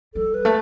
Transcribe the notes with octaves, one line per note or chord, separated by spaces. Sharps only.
G3 A4
B4
A3